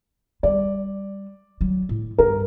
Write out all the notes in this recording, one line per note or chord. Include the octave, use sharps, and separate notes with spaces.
G3 D5
F#3
A2
G2 A#4